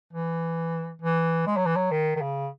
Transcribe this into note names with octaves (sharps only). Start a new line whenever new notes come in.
E3
E3
G#3
F#3
E3
F#3
D#3
D#3
C#3